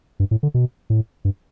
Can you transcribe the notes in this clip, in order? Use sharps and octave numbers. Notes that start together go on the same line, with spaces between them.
G2
A2
D3
B2
A2
G2